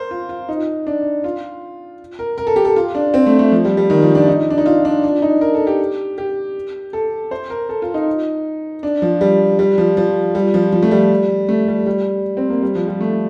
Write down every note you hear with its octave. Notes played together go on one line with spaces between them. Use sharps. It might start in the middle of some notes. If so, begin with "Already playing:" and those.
Already playing: A#4 C5
F4
F4
D#4
D4
F4
A#4
A#4
A4
G4
A4
F4
D4
C4
A3
A3
F3
G3
G3
D#3
F3
D4
D#4
D4
D#4
F4
D4
D4
D#4
A#4
A4
G4
G4
A4
C5
A#4
A4
F4
D#4
D4
F3
G3
G3
F3
F3
G3
F3
F3
A3
G3
A3
G3
G3
C4
A#3
G3
F3
G3
A3